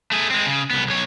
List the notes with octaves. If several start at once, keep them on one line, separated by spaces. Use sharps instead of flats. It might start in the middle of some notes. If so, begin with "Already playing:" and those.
A3 G#4
G#3 C4
C#3
C2 B3
B1 C#5